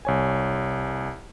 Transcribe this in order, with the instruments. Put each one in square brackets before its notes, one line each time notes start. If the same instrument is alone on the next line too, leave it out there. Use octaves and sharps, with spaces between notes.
[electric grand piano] C2 C#5 G#5